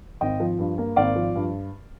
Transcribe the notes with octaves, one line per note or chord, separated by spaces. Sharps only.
G#1 D#5 G5
F3
G2
A#3
G#1 D5 F5
F3
G2